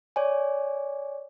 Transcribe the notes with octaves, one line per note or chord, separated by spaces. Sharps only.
C#5 D5 G#5